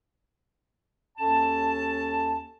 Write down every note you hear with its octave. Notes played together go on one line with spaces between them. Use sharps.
D#2 C#4 A4 A5